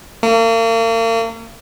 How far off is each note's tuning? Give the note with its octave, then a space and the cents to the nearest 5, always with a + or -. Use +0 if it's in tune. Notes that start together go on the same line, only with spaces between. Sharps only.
A#3 -40